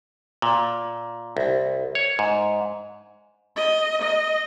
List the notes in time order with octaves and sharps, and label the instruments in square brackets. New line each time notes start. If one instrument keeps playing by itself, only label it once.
[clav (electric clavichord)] A#2
C2
C#5
G#2
[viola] D#5
D#5